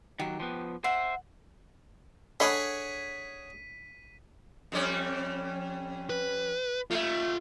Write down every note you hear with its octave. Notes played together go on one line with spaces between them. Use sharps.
D#3 F#3 G4
F3 B3
C5 E5 F#5
D3 G#4 C#5 D#5 F#5 B5 B6 D#7
F2 G3 C#4
B4
A3 F4 E5